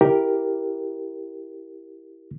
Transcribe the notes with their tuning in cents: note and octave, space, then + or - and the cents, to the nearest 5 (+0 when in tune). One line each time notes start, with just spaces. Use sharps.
E4 +0 G4 +0 A#4 +0